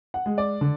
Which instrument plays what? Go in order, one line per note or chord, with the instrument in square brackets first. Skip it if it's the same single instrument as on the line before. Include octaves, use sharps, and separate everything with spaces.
[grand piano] F#5
G#3
D5
D3